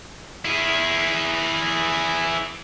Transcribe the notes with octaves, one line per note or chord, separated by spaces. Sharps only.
E4 G#4